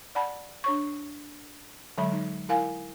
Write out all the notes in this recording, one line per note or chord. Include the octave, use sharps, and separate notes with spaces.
D5 F#5 A5 B5
D4 C#5 C#6
D3 F#3 G#3 E5 B5
D#4
E4 A#4 F5 G#5